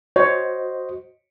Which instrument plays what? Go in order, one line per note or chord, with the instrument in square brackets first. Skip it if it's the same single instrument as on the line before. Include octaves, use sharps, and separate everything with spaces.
[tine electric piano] F#4 C5 D#5 [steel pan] C#5